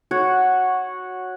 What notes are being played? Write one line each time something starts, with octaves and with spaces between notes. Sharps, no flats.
F#4 C#5 F#5